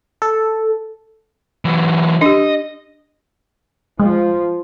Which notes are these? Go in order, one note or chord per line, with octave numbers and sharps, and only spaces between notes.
A4
E3 F#3
D4 G4 D#5
F3 G#3